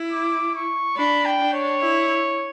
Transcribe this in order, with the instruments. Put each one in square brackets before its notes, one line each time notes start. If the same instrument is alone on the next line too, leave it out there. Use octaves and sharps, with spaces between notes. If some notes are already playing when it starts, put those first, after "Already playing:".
Already playing: [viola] E4
[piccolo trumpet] D6
C#6
[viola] D4 [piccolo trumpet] B5
[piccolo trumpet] G5
[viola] D4
[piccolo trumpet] C#5
[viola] E4